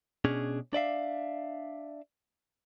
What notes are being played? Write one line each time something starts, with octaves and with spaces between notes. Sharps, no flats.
B2 C#4 D4 G#4
D4 D5 E5 F5